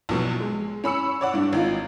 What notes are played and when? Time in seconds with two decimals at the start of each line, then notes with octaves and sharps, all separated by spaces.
0.09 A#1 B2 F#3
0.40 G#3
0.84 C#4 B5 E6 C#7
1.21 C#5 D5 F#5
1.34 G2 D4
1.53 G#1 D#4 F4